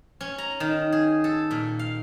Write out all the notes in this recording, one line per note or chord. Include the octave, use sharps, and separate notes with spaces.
C#4
A#5
D#3
G#4
A4
A#2
F5